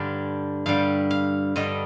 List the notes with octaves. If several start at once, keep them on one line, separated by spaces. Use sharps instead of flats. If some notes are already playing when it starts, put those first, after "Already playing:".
Already playing: G2 D3 G3 F5
G2 D3 G3 F5
F5
G2 D3 G3 D#5